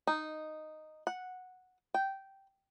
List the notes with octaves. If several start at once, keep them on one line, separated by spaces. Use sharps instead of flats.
D#4
F#5
G5